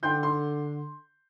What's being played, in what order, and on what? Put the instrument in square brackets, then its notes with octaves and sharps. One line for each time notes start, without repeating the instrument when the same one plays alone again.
[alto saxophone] D3 [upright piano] G5 C6 G6
[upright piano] C6